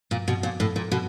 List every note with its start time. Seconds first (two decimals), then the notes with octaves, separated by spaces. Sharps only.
0.11 A#2
0.28 B2
0.43 A#2
0.60 A2
0.76 A#2
0.92 B2